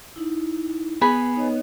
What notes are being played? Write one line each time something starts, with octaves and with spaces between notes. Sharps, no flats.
D#4 E4
B3 G#4 B5
D#4 C#5 D#5